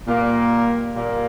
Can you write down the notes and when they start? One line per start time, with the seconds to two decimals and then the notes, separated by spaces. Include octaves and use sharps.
0.06 A#2 G3 A#3
0.93 A#2 G3 A#3